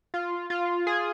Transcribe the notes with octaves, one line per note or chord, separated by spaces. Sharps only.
F4
F4
G#4